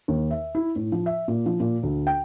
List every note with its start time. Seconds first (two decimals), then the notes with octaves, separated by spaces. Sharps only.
0.08 D#2
0.31 E5
0.55 E4
0.76 A2
0.92 F3
1.06 E5
1.28 A#2
1.46 F3
1.60 A#2
1.83 D2
2.07 G5